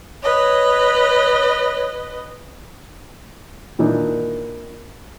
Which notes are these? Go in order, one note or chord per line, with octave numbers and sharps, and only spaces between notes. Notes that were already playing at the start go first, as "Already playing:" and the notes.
B4 C#5 D#5
A#2 D#3 E3 A#3 D4 D#4